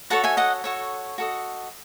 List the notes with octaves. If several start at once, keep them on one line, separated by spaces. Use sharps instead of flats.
F#4 A4 C#5 F#5 A5
E5 G#5
D#5 F#5
F#4 A4 C#5
F#4 A4 D#5